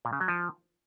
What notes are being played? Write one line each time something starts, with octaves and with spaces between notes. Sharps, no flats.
A#2
C#3
F#3
F3